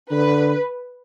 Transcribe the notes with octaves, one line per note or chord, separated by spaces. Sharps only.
D3 B4